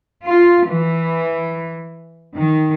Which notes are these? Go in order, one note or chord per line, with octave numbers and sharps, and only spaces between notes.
F4
E3
D#3